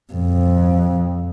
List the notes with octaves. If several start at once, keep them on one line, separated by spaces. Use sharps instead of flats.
F2